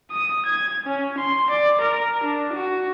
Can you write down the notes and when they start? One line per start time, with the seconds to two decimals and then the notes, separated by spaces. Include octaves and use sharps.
0.11 D#6
0.46 G#6
0.86 C#4
1.18 C6
1.50 D5
1.80 A#4
2.23 D4
2.53 F#4